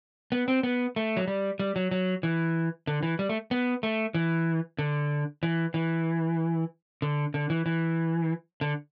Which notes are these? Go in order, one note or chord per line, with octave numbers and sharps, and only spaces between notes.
B3
C4
B3
A3
F#3
G3
G3
F#3
F#3
E3
D3
E3
G3
A3
B3
A3
E3
D3
E3
E3
D3
D3
E3
E3
D3